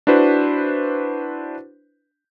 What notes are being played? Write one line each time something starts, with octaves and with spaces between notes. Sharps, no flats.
D4 E4 F#4 B4 C5